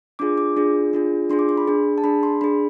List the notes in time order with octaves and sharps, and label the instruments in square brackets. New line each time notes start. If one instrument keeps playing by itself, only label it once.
[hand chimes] D4 F4 G#4 D6
D6
D4 F4 G#4
D4 F4 G#4
D4 F4 G#4 C6
D6
C6
B5
D4 G#4
A5
D4 G#4 B5
C6
D4 G#4 B5